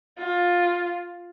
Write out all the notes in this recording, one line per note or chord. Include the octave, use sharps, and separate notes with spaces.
F4